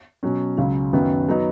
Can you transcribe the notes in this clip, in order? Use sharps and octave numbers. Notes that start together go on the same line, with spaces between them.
B2 F#3 C#4
C#2 C#3 F#3
F#2 D#3 F#3 B3
F#3 B3 D#4